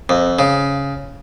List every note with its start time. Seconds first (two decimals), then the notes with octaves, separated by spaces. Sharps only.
0.09 F2
0.39 C#3